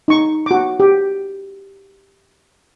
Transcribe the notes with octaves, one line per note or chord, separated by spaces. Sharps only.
D#4 C#6
F#4 D6
G4